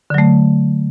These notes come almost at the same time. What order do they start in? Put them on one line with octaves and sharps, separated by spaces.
D3 F#3 A3